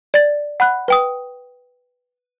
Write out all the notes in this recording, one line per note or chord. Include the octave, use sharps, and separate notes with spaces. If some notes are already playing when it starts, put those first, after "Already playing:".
D5 A6
F#5 B5 F#6
B4 G5 D#6